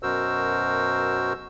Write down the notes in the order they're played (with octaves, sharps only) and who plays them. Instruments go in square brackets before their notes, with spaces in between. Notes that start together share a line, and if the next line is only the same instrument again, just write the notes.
[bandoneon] F#2 B2 F#4 A#4 C5 E6